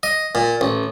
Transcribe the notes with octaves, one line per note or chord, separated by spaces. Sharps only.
D#5
A#2
A1